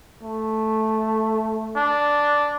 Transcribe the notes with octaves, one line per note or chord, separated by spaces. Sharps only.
A3
D4